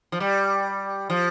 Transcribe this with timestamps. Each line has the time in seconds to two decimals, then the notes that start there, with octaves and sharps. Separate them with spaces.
0.12 F3
0.20 G3
1.10 F3